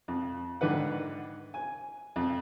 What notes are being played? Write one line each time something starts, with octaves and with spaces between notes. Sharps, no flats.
F2
G#2 D3 D#3 B4 F#5
G#5
F2